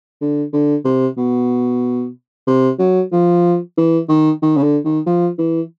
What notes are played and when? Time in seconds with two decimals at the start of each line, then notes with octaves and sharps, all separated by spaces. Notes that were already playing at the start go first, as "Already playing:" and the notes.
0.21 D3
0.53 D3
0.85 C3
1.17 B2
2.48 C3
2.79 F#3
3.12 F3
3.78 E3
4.09 D#3
4.42 D#3
4.57 C#3
4.63 D3
4.85 D#3
5.07 F3
5.39 E3